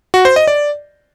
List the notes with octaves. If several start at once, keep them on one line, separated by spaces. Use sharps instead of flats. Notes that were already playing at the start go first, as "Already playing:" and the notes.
F#4
C5
D#5
D5